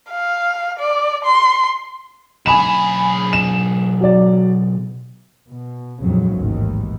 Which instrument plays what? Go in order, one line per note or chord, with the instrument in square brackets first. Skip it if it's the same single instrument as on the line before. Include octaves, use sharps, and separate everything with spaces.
[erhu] F5
D5
C6
[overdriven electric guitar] B1 G#4 [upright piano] G#5 B5 E7
[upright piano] E7
F#3 D5
[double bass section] B2
A#1 F2 G#2 C#3 F#3
A1 D#2 G#2 D#3 E3